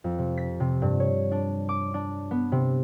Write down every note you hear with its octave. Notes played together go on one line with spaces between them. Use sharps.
F2
C3
B6
C3
G2
C#5
D4
D6
D4
B3
C3